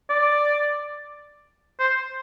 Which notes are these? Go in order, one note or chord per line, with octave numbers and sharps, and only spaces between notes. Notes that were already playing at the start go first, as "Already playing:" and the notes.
D5
C5